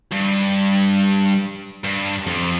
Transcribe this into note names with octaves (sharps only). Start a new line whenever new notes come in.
G2
G2
F2